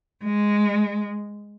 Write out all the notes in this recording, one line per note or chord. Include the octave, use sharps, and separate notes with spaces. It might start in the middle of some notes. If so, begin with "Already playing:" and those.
G#3